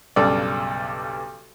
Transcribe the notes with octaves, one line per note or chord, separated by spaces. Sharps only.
B1 G2 C#3 A4 D5